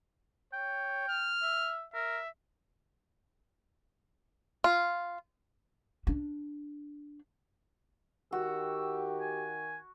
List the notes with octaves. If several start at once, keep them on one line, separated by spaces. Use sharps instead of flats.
C#5 G5
F6
E5
A#4 E5
F4
D4
D#3 F#4 G4 E6
G#5